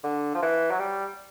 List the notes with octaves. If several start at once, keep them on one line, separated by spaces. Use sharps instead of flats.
D3
F3
E3
F#3
G3